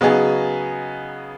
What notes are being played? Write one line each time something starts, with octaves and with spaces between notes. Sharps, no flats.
C#3 F#3 B3 D#4 G#4